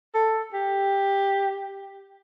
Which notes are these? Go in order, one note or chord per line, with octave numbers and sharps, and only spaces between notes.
A4
G4